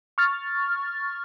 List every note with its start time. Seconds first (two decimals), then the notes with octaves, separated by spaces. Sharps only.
0.18 C#6 F6 A6